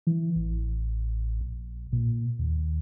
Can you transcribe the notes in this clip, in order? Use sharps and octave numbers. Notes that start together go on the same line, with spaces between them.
E3
A1
A#1
A#2
D#2